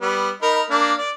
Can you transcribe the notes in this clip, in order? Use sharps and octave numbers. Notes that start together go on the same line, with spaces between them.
G3 B3
D#4 A#4 B5
A#3 D4
D5